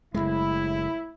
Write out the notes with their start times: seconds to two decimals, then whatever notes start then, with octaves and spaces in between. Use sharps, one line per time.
0.14 F#1 C#2 A2 G#3 E4